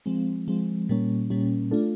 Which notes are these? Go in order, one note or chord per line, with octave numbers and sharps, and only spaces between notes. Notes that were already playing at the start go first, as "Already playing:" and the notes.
F3 G#3 C4
F3 G#3 C4
A#2 G3 A#3 C#4
A#2 G3 A#3 C#4
A3 D4 F4 A4